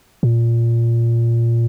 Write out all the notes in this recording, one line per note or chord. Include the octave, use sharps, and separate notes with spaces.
A#2